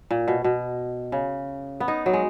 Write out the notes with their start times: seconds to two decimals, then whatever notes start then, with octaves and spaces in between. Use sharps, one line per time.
0.11 A#2
0.28 B2
0.44 B2
1.12 C#3
1.80 B3
1.88 D#4
2.06 F#3
2.13 G#3